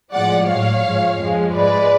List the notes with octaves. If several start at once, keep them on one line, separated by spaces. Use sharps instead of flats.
A2 F3 G#3 D5 F#5
A2 F#3 C#5 F5
G#2 F3 G#3
F2 F3 G#3
G#2 G#3 B4 D5